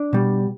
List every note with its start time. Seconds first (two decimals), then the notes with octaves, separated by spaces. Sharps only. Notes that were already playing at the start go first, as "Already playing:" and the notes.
Already playing: D4
0.13 B2 G3